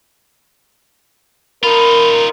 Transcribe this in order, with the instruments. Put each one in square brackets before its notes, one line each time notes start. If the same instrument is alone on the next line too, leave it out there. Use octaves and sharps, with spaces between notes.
[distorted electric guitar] D#4 F4 [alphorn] A#4 [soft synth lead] B5